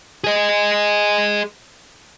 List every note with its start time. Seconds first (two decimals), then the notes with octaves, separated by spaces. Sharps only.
0.24 G#4 D#5